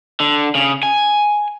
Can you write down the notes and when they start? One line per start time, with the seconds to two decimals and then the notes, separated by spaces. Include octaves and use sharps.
0.20 D3
0.55 C#3
0.83 G#5